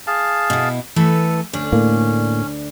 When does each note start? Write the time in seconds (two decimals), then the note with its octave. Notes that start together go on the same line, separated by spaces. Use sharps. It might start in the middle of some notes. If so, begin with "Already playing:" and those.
0.07 G#4 F5 A5
0.50 B2 E4
0.96 E3 A3 A4 B4
1.53 D2 C#4 D4
1.72 A2 A#3